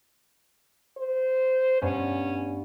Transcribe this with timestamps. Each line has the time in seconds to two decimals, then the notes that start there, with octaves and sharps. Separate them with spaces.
0.98 C5
1.82 G2 B3 C#4